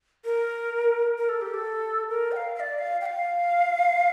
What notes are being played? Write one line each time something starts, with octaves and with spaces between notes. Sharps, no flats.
A#4
A#4
A4
G4
A4
A#4
G5
F5
F5
D5
F5
G5
F5